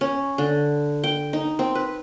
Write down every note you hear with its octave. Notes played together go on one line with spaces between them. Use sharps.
C#4
D3
G5
D#4
C4
B4